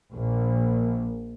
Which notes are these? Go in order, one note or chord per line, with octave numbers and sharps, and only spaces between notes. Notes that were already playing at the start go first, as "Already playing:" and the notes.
A#1